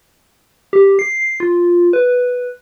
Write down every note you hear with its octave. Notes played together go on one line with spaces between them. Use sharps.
G4
C7
F4
B4